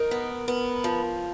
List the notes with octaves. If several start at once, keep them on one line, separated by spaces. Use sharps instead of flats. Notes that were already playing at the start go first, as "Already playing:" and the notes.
Already playing: D#4 A#4
B3
B3
F3